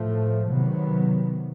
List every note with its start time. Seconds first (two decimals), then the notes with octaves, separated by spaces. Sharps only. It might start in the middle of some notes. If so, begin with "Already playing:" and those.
Already playing: A2 F3 A3
0.50 C3 D#3 F#3 B3